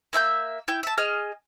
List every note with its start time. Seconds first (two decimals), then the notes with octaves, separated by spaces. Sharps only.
0.13 A#3 E5 G#5 G6
0.68 E4 G5 G6
0.83 E5 A5
0.98 G#4 D#5 F6